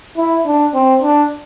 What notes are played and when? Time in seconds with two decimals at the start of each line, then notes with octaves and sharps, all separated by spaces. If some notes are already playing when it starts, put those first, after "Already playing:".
0.17 E4
0.46 D4
0.74 C4
1.02 D4